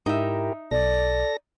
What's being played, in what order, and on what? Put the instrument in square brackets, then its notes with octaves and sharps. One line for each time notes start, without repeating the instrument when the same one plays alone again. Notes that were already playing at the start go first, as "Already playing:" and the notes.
[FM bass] G#2 [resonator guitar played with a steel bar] D#4 E5 [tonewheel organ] E4 G4 A#4
[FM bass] B1 [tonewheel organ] A4 A#6 [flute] D5